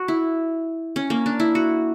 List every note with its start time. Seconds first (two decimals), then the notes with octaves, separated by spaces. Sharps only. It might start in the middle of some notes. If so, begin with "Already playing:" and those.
Already playing: F#4
0.08 E4
0.96 C#4
1.10 A#3
1.26 D4
1.40 E4
1.55 F#4